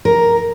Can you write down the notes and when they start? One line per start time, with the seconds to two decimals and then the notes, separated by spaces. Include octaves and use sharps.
0.05 A#4